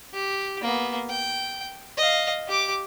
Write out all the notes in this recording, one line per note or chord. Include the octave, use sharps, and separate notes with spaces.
G4
A#3 B3
G5
D#5 F5
G4 D6